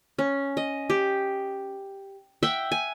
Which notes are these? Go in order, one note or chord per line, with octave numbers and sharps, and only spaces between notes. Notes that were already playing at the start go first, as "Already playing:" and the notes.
C#4
D#5
G4
E5 F#5 G5
G#5